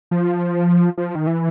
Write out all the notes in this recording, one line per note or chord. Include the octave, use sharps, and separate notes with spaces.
F3
F3
D#3
E3